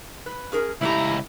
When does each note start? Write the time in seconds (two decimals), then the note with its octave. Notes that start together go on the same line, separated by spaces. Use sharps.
0.26 B4
0.52 C#4 G#4 A#4
0.81 C#2 E3 A3 E4 G4 A#5